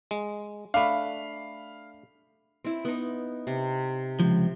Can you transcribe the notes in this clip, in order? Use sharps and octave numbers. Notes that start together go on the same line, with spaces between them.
G#3
A3 D4 F5 B5
C4 E4
B3 D#4
C3
C#2 F3